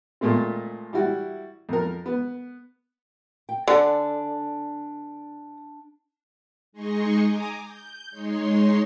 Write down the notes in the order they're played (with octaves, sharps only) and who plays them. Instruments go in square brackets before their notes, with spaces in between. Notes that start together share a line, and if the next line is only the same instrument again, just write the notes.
[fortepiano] A#2 G#3 A3 C4
G3 E4 F#4
F2 A#4
B3
[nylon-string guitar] G5
[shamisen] D3 [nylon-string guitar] D4 A4 G#5
[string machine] G#3 D#4 G#4 D#5 C6 C#6
G#5 A#5 D6 D#6
G6
G#3 D#4 C#5 C6